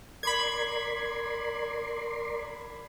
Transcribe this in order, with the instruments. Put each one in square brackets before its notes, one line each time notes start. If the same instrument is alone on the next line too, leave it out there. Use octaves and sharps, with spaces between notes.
[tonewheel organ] A#4 D5 C6 [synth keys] B5 G#6